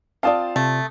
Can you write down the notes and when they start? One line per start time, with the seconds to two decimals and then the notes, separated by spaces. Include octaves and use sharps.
0.23 C4 F4 D5 F5 A5 D#6
0.56 C3 A3